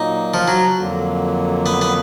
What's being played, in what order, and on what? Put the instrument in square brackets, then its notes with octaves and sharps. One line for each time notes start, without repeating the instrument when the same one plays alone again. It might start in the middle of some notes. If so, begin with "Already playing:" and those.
Already playing: [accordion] A#2 F#3 A#3 [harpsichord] D#4
[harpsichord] F3
F#3
[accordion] F2 D3 F#3 A#3
[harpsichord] B3
B3